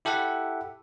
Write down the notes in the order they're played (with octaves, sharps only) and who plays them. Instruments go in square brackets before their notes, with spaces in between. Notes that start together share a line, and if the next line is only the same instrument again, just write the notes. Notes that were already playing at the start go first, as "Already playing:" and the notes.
[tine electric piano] E4 G4 A4 E5 F#5